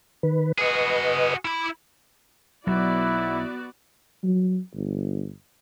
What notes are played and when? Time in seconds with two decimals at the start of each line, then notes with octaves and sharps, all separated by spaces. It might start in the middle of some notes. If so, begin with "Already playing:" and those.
0.23 D#3 B4
0.58 F#4 G#4 B4 D#5
1.45 E4 B5 D6
2.67 B1 F#3 B3 E4 F#4 D5
4.23 F#3
4.74 G1